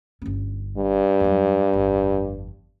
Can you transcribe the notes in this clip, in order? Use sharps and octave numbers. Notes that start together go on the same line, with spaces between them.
G1 C#4
G2
F2 F#3
G1 F2